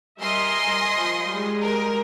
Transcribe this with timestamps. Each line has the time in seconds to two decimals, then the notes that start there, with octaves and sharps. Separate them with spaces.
0.20 G3 A#4 D#5 E5 G#5 C6
0.96 F3
1.30 G3 G#3
1.62 A#4